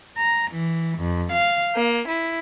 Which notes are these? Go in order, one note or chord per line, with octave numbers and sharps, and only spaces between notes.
A#5
E3
F2
F5
A#3
E4